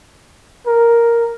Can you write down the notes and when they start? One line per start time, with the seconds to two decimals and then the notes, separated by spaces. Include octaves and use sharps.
0.67 A#4